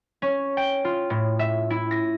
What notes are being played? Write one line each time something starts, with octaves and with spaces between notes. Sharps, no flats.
C#4
G5
F4
A2
E5
E4
A#6